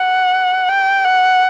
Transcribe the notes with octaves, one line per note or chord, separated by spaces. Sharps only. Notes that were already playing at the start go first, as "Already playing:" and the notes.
Already playing: F#5
G5
F#5